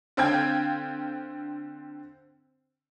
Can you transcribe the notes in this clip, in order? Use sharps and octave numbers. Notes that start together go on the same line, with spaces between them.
D3 C4 F5 G5 G#6